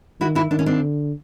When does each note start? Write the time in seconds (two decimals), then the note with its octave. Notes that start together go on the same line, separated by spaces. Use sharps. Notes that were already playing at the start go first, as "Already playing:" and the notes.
0.21 D#3 E4 F#4
0.35 E4 F#4
0.51 D#3 D4
0.59 C#4
0.66 C4 D4
0.81 D3